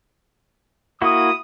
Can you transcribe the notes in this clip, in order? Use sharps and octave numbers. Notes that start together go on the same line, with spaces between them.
A#3 E4 F#4 D#6